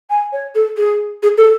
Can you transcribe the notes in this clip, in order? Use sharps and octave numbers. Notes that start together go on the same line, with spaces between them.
G#5
C#5
A4
G#4
G#4
A4